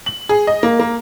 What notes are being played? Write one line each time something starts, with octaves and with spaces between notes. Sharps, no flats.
F#7
G#4
D#5
A#3
A#3